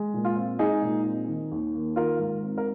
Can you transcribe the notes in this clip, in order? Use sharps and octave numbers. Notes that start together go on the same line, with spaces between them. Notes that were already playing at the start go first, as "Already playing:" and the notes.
Already playing: G#3
A#2
F4
C4
G#3 D#4 G#4
A#2
C4
D#3
D#2
A#3
D#3 F4 A#4
G#2
C4
A#4